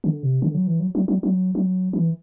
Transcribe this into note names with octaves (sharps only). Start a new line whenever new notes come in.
D3
C3
D3
F#3
E3
F#3
F#3
F#3
F#3
F#3
E3